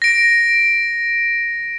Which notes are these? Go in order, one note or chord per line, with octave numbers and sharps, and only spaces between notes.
A#6 D7